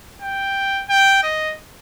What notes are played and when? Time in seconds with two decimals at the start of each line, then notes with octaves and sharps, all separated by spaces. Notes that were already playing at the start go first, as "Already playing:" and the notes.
0.22 G5
0.89 G5
1.23 D#5